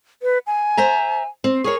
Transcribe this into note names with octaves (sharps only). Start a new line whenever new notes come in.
B4
G#5
C5 E5 A#5
C4
G#4 A#4 C#5 C#6